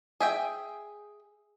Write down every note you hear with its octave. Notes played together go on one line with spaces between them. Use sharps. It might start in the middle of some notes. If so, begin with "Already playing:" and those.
G#4 E5 G5